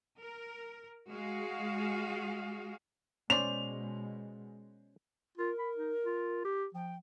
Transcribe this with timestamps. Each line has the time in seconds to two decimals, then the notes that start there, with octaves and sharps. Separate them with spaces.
0.19 A#4
1.09 G#3 F#4 G#4 F5
3.30 B2 G#3 C#4 C5 D5 F7
5.38 F4 A#4
5.59 B5
5.77 D#4
6.05 F4
6.44 G4
6.74 F3 G5